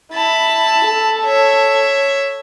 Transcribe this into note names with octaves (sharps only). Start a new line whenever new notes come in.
E4 A5 B5
A4
C#5 E5